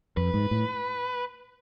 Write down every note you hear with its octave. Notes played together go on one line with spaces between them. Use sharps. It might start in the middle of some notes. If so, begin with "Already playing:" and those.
F2 B4
G#2
A2